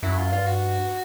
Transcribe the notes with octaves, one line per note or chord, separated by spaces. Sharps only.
F#2 E4
F4
G2 F4
F#4